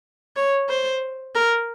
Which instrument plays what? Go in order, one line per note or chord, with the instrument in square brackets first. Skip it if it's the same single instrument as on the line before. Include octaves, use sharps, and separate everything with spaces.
[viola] C#5
C5
A#4